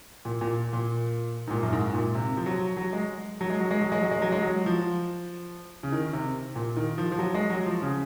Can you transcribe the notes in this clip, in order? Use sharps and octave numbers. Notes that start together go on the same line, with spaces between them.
A#2
A#2
A#2
G#2
A#2
F#2
G#2
A#2
C3
F3
F#3
F#3
G#3
F#3
G#3
F#3
G#3
F#3
G#3
F#3
G#3
F#3
G#3
F#3
F3
C#3
D#3
C3
A#2
D#3
F3
F3
F#3
G#3
F#3
F3
C#3